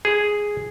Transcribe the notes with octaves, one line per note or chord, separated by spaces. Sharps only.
G#4